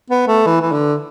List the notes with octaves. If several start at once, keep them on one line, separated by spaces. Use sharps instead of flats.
B3
A3
E3
E3
D3